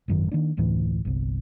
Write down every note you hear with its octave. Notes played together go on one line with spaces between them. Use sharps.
G#1 F#2 D#3
D#3 A#3 D4
F#1 D2 A2 E3
G1 C2